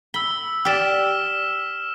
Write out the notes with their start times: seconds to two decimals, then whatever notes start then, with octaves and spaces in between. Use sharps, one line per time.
0.14 B5 E6 G7
0.65 G4 D5 F6 B6 E7